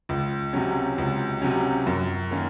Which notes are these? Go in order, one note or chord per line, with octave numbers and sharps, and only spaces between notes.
C#2
C3 F#3 C#4
C#2
C3 F#3 C#4
F#2
D#3 A#3 C#4